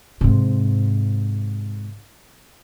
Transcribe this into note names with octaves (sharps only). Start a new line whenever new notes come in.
G#2 C3